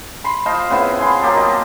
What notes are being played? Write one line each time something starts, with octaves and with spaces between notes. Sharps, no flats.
B5 C6
F4 C5 D#5 A5
C#3 B3 C4 E4
F4 G#4 C6
F#3 A#3 G4 A4
G4 D#5